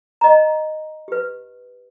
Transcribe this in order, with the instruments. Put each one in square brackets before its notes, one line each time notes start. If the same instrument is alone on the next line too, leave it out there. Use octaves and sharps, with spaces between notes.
[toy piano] D#5 A#5
G4 B4